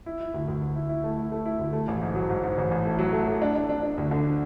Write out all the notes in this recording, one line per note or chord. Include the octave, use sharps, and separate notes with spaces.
E4
E4
D2
D2
D2
E4
E4
A3
E4
A3
E4
D2
A3
A1
G#2
F#3
G#2
G#2
A1
A1
A3
F#3
A3
A3
D4
D4
D4
D4
D2
D3